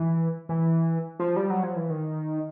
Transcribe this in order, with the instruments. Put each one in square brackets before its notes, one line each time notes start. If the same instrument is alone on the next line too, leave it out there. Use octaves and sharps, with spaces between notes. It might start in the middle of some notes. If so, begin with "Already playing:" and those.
Already playing: [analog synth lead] E3
E3
F3
G3
F#3
F3
E3
D#3